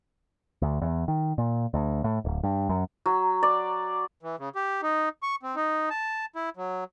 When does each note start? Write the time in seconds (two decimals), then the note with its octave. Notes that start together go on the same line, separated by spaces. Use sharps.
0.62 D2
0.82 E2
1.08 D#3
1.38 A#2
1.74 D2
2.04 A2
2.25 D1
2.43 G2
2.69 F#2
3.06 F#3
3.43 D5
4.23 E3
4.39 C#3
4.56 G4
4.82 D#4
5.23 C#6
5.43 C4
5.56 D#4
5.90 A5
6.36 E4
6.57 F#3